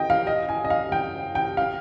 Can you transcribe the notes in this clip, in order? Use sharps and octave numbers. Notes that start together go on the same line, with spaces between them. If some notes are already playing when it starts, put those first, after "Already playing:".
Already playing: D#5 G5
F5
D#5
G#5
D#5
F5
G5
G5
F5